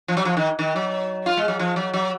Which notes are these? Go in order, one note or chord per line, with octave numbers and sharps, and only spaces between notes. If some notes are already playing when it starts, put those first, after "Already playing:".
F3
F#3
F3
D#3
D#3
F#3
F4
G#3
F#3
F3
F#3
F#3